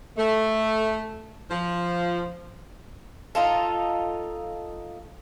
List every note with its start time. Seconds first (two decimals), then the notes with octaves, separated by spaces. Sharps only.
0.17 A3
1.51 F3
3.35 D#4 F4 A4